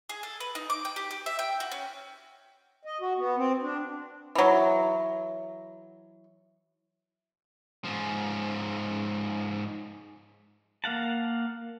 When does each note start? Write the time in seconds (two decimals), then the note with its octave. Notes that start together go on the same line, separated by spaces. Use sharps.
0.09 G#4
0.23 A4
0.40 B4
0.55 D#4
0.70 D6
0.85 G5
0.96 G4
1.11 G4
1.26 E5
1.39 G5
1.60 F#4
1.71 C#4
2.85 D#5
3.01 F#4
3.18 B3
3.37 C4
3.62 D4
4.35 E3 F#3
7.84 G#2 F3
10.84 A#3 F5 F#5 A5